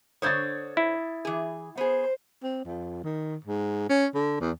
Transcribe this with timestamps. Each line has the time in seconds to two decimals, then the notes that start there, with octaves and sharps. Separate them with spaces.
0.22 D3 C5 C#5 D#6 G#6 A6
0.77 E4
1.25 E3 G#4
1.78 B3 G#4 C5
2.43 C4
2.64 F2
3.04 D#3
3.44 G#2
3.89 C#4
4.15 D3
4.40 E2